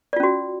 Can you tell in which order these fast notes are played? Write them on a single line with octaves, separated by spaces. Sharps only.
D5 F4 C#4 F#4